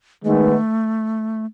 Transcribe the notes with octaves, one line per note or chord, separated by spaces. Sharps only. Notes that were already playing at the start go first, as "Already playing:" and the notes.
D#3 G#3 A3 B3